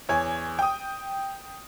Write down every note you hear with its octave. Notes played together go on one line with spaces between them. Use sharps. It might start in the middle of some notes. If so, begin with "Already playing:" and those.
E2 C#5 G#5
G5 D#6